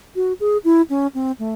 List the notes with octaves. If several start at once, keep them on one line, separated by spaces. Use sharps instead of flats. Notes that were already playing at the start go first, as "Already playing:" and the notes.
F#4
G#4
E4
C#4
C4
A3